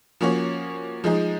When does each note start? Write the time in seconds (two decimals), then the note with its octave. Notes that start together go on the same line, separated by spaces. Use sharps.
0.21 F3 A#3 C#4 F#4 C#5
1.04 F3 G#3 D#4 G#4